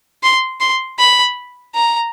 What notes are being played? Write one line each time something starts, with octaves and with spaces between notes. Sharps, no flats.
C6
C6
B5
A#5